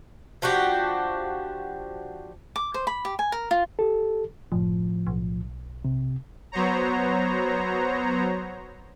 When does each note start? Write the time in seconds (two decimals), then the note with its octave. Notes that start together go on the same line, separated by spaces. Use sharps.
0.42 F3 D4 F#4 G4
2.56 D6
2.74 C5
2.87 B5
3.05 G4
3.19 G#5
3.32 A#4
3.51 F4
3.79 G4 A4
4.52 F#1 A2 F3
5.07 B1
5.85 C3
6.52 F#3 B3 C5 C#5 A#5